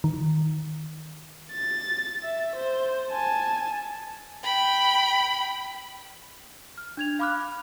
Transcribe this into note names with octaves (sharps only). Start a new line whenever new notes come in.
D#3
A6
E5
C5
G#5 A5
G5 B5
F6
D4 G#6 F7
F5 B5 D6 F6 F#6